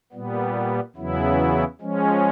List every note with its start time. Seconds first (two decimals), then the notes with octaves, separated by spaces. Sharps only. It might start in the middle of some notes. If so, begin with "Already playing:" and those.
0.12 A#2 G3 B3
0.96 E2 C#3 F#3 B3 E4
1.81 F3 G#3 C#4